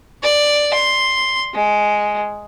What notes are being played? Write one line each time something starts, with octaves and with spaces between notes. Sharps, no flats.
D5
C6
G#3